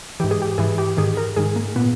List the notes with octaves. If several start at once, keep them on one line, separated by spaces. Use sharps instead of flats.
G#2 E3 G4
G#4
G4
G#2 E3 G#4
G4
G#2 D#3 G#4
A#4
G#2 D#3 G#4
A#3
A#2 B3